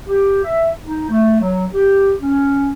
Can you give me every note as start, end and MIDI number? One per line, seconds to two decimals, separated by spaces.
0.08 0.40 67
0.43 0.70 76
0.83 1.09 63
1.09 1.40 57
1.41 1.65 54
1.74 2.13 67
2.21 2.72 61